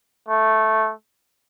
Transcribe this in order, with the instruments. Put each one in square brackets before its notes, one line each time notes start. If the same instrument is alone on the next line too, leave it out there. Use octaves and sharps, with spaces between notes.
[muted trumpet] A3